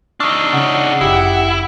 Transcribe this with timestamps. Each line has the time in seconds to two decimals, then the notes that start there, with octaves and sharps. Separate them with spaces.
0.20 D4 D#4 C#6 E6 F6
0.53 C#3 F#5
1.01 G1 F#2 E4 G4